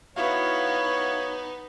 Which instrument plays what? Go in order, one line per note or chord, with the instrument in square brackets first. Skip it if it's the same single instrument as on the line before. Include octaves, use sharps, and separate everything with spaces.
[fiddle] B3 D#4 [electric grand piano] E4 F#4 F5 [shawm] C#5